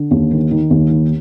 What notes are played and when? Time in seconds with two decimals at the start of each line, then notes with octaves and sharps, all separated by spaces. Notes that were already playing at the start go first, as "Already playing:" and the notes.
Already playing: D3
0.11 D#2
0.31 D#3
0.51 D#3
0.70 D#2
0.90 D#3